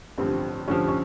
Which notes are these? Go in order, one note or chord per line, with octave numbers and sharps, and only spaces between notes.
A1 G2 D3 F3 C4
A1 G2 D3 F3 C#4
C#4